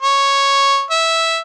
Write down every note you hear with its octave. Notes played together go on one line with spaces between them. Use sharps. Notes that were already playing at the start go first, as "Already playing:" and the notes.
C#5
E5